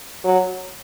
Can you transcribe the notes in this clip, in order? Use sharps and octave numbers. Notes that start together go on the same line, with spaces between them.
F#3